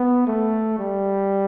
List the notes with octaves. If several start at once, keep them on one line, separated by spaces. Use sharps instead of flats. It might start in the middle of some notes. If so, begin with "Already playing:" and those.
Already playing: B3
A3
G3